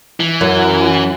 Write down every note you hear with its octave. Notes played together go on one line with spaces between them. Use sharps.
E3
F#2